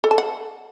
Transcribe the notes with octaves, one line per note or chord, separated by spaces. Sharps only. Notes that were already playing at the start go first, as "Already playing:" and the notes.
A4
A5
F#5